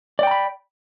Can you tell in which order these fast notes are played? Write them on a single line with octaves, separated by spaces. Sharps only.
D5 G5 A#5 B5